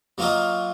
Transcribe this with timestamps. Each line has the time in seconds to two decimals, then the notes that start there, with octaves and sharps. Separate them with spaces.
0.18 F#3 A#3 F4 A#4 D#5